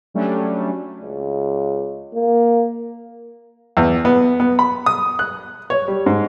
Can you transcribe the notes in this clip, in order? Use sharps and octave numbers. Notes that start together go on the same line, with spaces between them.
F#3 G3 A3 C#4 D4
C#2
A#3
E2
B3
B3
B5
D#6
F#6
C#5
G3
G#2